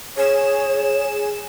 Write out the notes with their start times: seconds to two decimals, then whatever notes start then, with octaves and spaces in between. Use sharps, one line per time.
0.17 G#4 C#5 E7